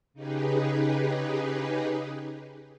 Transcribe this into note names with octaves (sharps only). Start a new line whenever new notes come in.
C#3 D#4 G4 G#4 B4